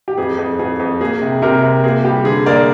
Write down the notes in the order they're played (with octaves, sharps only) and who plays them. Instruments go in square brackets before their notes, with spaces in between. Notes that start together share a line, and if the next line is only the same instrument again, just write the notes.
[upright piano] G4
F2 G#4
F2
F2 G#4
F2
A#3 G#4
C3
C3 G4 A#4
C3
A#3 G#4
G3 G4
D3 G#4
A#3 A#4 D5